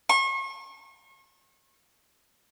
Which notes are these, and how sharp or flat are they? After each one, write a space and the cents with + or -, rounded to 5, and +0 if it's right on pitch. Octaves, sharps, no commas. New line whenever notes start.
C#6 -40